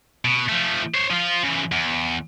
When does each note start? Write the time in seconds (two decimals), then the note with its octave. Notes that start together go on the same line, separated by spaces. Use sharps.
0.25 B2
0.49 F3 A3
0.94 C5 C#5
1.10 F3 F4
1.44 C#3 E3
1.72 E2